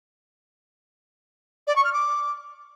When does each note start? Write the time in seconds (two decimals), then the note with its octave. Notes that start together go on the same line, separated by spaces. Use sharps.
1.67 D5
1.76 C#6
1.84 F6
1.93 D6